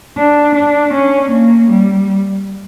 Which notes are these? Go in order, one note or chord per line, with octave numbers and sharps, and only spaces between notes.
D4
D4
C#4
A#3
G3